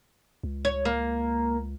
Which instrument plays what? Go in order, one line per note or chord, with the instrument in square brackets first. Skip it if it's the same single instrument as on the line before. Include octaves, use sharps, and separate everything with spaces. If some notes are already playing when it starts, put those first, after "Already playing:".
[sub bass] C#2
[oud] C#5
A#3